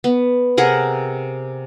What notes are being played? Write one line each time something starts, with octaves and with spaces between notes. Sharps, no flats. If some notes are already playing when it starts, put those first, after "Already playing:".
B3
C3 G#4 A#4 F#5